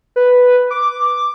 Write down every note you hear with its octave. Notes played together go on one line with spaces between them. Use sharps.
B4
D6